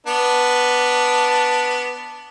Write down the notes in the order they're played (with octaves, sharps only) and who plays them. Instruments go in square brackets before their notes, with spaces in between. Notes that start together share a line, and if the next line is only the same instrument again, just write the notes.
[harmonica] B3 D4